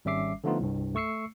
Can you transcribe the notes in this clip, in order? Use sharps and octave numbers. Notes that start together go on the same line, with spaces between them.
G#1 G3 C#4 E5 D6 C7
D3 F3 A3 B3 D#4 F4
C2 G2
A3 C#6 E6 C7 C#7